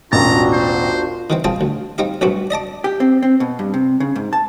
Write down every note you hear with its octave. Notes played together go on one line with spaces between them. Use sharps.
E1 A1 D4 F4 F#4 A#5 A6
C5
D#3 E3 C4
C4 F4 G#4 F5 G5 A5
D2
C4 D#4 G4 F5
B1 G2 A3 C4 F#4 G4
D5 D#5 A5 D6
G4
C4
C4
B2
G2
C3
C#3
G#2
A5